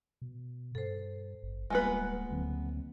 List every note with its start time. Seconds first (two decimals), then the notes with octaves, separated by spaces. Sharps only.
0.22 B2
0.75 G2 A4 C5
1.43 G#1
1.70 D1 G3 G#3 A#3 B3 F4 B4
2.31 D2 D3 F#3 C4